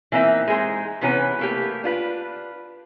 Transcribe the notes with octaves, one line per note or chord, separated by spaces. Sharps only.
E3 A#3 C4 D#4 E5
G#3 D#4 G#4 A4 C5
C3 E3 B3 C#4 G4 B4
A3 A#3 G4
D4 F4 B4